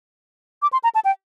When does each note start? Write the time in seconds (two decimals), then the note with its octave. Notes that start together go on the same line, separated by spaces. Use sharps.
0.62 D6
0.73 C6
0.84 A#5
0.95 A5
1.05 G5